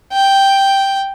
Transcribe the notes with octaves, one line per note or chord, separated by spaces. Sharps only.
G5